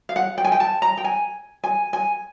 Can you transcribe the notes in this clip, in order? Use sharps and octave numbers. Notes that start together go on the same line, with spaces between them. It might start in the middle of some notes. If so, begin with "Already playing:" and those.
F5
F#5
G5
G#5
G5
A5
A#5
G5
G#5
G#5
G#5